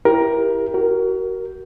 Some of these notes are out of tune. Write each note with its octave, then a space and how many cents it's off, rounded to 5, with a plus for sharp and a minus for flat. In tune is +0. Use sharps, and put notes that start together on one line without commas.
E4 +15 G4 +0 A#4 +15
F#4 +30 A#4 +0